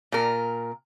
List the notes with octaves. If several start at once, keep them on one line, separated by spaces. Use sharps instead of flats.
A#2 A#4